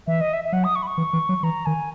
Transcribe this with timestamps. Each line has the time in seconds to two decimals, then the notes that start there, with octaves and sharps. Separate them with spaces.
0.07 E3 E5
0.21 D#5
0.33 E5
0.45 E5
0.53 F#3 F#5
0.64 D#6
0.75 C#6
0.83 B5
0.87 C#6
0.98 E3
1.13 E3
1.29 F#3
1.43 E3 A#5
1.66 D#3 G#5